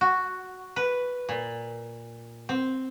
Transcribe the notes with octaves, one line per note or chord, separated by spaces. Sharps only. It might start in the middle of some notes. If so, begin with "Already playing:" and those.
F#4
B4
A#2
C4